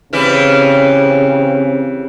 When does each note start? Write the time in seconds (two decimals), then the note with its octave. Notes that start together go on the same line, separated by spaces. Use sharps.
0.13 C#3 E3 G3 C4 E4